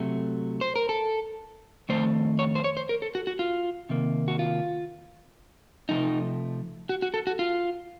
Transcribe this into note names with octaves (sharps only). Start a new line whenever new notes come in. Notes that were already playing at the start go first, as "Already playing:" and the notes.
Already playing: C3 F#3 A3
C5
A#4
A4
F2 D#3 A3 C5
C#5
C5
C#5
C5
A#4
A4
F#4
F#4
F4
C3 D#3 A#3
F#4
F4
C3 F3 A3 D#4
F#4
F#4
A4
F#4
F4